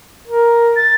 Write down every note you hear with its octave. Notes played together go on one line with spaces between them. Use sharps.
A#4
A6